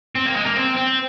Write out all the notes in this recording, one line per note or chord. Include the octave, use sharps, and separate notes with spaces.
C4
A#3
G#3
A#3
C4
C4